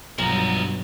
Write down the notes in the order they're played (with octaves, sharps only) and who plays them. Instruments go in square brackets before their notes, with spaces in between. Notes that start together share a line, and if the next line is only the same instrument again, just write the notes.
[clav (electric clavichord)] B1 [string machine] G2 F#3 [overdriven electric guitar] F3 B3 [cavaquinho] A#5